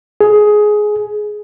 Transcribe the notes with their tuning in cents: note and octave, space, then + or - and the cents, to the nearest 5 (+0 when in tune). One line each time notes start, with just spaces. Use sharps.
G#4 +15